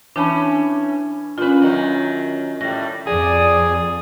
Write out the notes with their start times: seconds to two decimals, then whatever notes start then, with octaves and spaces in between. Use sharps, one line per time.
0.16 E3 C#4 D4 A5 B5
1.38 A#2 C#4 F4 B4
1.62 F#2 D#3 F#3
2.61 A2 G3 A#6
3.07 F2 G#4 D5 D#6